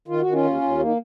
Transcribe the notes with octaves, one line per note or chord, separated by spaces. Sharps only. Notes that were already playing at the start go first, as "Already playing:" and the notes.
D#3 F4
D#3 F#4
C#4 F4
D#2
D#2
D#3 A#3